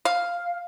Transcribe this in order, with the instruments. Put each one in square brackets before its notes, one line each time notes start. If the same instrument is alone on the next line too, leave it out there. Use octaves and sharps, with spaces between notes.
[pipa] F5